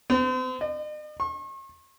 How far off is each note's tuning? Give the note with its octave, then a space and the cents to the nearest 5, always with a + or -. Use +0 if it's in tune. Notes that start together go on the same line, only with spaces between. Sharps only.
C4 -40
D#5 -45
C#6 -45